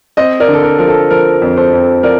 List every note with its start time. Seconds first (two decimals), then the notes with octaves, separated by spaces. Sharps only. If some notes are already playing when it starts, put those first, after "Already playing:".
0.17 C4 C5 D#5
0.40 A#4 D5
0.48 D3
0.54 A4
0.64 A#4
0.79 F3 A#4
0.88 A4
1.10 F3 A#4
1.42 F2
1.57 A4 C5
1.73 F2
2.03 F3 A#4 D5